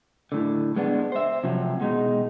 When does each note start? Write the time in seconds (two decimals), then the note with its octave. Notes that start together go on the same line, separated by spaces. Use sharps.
0.32 A2 D3
0.76 G#3 B3 D4
1.12 C5 E5
1.44 C3 F3 F#3
1.80 B2 G#3 D#4